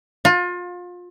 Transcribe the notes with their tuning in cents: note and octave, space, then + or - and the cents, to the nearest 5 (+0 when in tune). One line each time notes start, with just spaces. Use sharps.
F4 +30